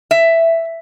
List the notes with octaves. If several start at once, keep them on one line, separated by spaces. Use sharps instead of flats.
E5